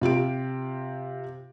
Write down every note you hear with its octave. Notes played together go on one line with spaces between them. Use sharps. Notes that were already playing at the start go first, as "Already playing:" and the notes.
C3 F4 G4 D7